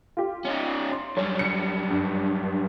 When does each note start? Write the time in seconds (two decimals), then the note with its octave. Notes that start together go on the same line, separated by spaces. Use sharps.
0.17 F4 G4
0.45 C#4 D#4
0.92 C6
1.17 F#2 G3 C#5
1.39 C#7
1.91 G2